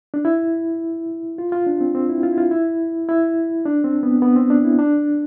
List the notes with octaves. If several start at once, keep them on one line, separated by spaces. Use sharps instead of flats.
D4
E4
F4
F4
D4
C4
C4
E4
F4
E4
F4
E4
E4
D4
C4
B3
B3
C4
D4
E4
D4